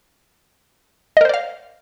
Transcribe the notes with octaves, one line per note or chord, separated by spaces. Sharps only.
A#4 C5 D5 D#5 F5